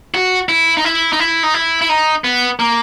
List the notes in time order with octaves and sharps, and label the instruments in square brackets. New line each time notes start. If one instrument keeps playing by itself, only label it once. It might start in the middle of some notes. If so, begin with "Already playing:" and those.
[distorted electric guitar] F#4
E4
D#4
E4
D#4
E4
D#4
E4
E4
D#4
B3
A#3